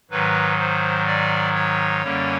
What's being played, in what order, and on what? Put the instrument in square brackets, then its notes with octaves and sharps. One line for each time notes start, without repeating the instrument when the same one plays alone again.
[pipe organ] G#2 D#3 F#3 B4
C5
D5
C#5
F#2 D3 G3 A#3 C#4